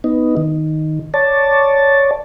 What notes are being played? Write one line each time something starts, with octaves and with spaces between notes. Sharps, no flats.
B3 D#4
D#3
C#5 D5 A5